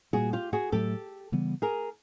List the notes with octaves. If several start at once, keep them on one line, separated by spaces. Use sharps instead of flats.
A#2 G3 A#3 F#4 G#4
F4 G4
F#4 G#4
A2 F#3 A3 G4 A4
C#3 E3 G3 B3
G#4 A#4